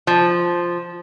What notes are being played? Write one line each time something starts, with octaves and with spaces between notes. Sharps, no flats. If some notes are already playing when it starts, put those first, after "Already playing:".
F3